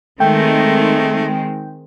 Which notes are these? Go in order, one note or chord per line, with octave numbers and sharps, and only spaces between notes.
D#3 G#3 A3 C4 G5